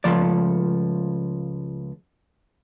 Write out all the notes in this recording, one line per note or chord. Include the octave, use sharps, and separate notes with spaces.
C#2 F3 A3 D5